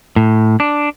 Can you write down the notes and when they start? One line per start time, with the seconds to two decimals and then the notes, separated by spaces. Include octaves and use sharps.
0.16 A2
0.60 D4